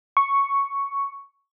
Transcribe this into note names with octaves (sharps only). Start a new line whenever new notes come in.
C#6